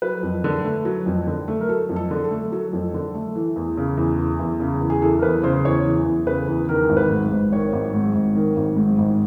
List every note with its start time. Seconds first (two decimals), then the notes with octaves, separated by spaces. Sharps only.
0.02 F#3 B4
0.23 F2
0.44 D3
0.64 A3
0.85 F#3
1.06 F2
1.27 D3
1.48 A3
1.61 A#4
1.69 F#3 A4
1.89 F2
1.96 A4
2.11 D3
2.24 A4
2.31 A3
2.52 F#3 A4
2.73 F2
2.94 D3
3.14 A3
3.35 E3
3.56 E2
3.77 C#3
3.97 E2
4.19 E3
4.40 E2
4.60 C#3
4.81 E2
4.90 G#4
5.02 E3 A4
5.19 A#4
5.23 E2 B4
5.43 C#3 C5
5.65 E2 C#5
5.86 E3
6.06 E2
6.27 C#3 B4
6.48 E2
6.69 D#3 A#4
6.89 G#1
6.97 B4
7.11 G#2
7.31 G#1
7.53 D#3 C#5
7.73 G#1
7.94 G#2
8.15 G#1
8.35 D#3
8.56 G#1
8.77 G#2
8.98 G#1